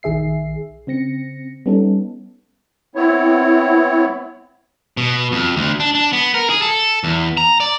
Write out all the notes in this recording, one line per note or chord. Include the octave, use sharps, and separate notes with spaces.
A#1 D#3 G#4 E5 C7
C#3 C4 A#6 C#7
G3 B3 C#4 D#4 A4
B3 C4 E4 C#5
B2
F2
D2
D4
D4
B3
A#4
G#4
A4
E2
A#5
D5